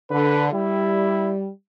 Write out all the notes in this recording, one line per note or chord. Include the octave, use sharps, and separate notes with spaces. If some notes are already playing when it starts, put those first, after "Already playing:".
D3 B4
G3 E4